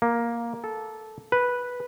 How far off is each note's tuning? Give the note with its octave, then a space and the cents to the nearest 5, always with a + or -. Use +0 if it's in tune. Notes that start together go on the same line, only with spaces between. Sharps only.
A#3 +5
A4 -10
B4 -5